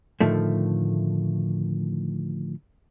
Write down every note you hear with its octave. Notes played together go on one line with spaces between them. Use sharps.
A2 D3 D#3 F3 A3